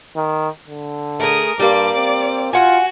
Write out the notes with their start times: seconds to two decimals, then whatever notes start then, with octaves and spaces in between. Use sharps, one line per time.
0.16 D#3
0.68 D3
1.20 A3 G#4 A#4 D#6
1.60 G2 G3 A#3 D5 D6
1.95 C4
2.53 F4 F#4 F#5 G#5